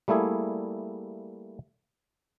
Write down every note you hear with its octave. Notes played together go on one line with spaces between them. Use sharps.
G3 A3 A#3 E4 G#4